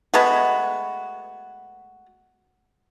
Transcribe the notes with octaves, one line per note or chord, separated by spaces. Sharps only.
G#3 A3 B3 F#4